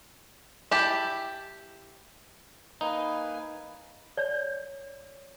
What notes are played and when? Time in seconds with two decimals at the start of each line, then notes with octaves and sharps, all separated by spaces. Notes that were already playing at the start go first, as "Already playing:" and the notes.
0.71 E4 G4 A5
2.81 A#3 D#4 B4 G#5
4.17 C#5 D5